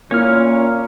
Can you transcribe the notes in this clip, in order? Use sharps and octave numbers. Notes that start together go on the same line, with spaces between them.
A#2 A#3 C#4 E4 C#5 F6